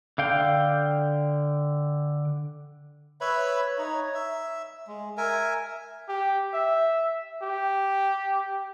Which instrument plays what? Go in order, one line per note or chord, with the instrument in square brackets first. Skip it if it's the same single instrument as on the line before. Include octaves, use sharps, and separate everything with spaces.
[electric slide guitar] D3 F5 G5
[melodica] B4 C#5 E5 B5
D#4 C#5
E5
G#3
A#4 E5 G#5
[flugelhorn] G4
E5
G4